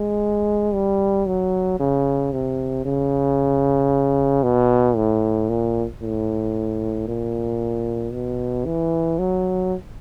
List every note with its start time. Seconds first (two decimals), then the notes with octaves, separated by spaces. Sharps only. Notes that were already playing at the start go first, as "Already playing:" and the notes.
Already playing: G#3
0.74 G3
1.27 F#3
1.80 C#3
2.33 C3
2.85 C#3
4.43 B2
4.96 A2
5.49 A#2
6.02 A2
7.08 A#2
8.13 B2
8.66 E3
9.19 F#3